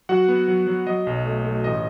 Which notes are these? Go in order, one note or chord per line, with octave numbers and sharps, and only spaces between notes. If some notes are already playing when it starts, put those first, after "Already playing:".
F#3 F#4 F#5
B3
F#3
F#3
F#3 D#5
B1
A3
A3
A1 D#5